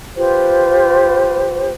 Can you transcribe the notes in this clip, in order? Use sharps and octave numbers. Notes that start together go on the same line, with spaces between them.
F4 G4 B4 C5